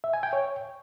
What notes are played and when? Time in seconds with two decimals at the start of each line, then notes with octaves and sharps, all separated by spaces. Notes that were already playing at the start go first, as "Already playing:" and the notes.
0.04 E5
0.13 G#5
0.23 G5
0.33 C#5